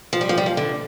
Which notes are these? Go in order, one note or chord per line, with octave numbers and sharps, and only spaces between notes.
F3
G3
F3
G3
F3
D3